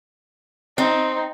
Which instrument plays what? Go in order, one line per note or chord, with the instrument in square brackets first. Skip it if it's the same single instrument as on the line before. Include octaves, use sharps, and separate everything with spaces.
[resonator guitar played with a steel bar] C4 [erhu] D#4